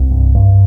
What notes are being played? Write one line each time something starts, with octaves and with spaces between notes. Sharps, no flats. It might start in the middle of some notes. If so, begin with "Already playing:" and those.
Already playing: C2
G2
G2